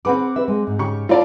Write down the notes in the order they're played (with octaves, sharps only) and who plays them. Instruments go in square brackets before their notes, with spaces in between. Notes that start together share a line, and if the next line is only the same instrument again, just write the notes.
[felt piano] C4 F#5 D6 [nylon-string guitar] G#4 B4
[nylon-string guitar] G4 B4 E5
G#3
G#2
[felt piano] C#3 G4 C#6
[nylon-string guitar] A3 E4 F5 [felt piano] F4 D5 A5